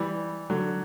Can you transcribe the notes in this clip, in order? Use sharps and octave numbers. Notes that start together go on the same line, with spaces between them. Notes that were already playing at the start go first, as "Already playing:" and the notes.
Already playing: E3 G3
D3 F#3